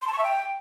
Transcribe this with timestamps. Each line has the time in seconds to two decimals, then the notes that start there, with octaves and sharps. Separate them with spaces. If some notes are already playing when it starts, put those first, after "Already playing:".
0.02 C6
0.07 A5
0.13 C#6
0.18 E5
0.24 G5